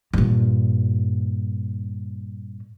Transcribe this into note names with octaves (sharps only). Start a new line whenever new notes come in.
G2 A#2